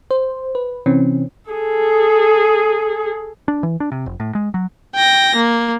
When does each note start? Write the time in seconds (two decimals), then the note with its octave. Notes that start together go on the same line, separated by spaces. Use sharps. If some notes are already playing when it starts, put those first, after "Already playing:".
0.11 C5
0.55 B4
0.86 C3 E3 C4 C#4
1.50 G#4 A4
3.48 D4
3.63 E3
3.80 D4
3.92 C3
4.06 F1
4.20 A2
4.35 G#3
4.54 F#3
4.95 G5 A#6
5.35 A#3